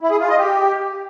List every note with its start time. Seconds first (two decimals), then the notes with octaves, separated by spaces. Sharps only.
0.01 E4
0.10 G#4
0.20 F4
0.29 D#5
0.39 G4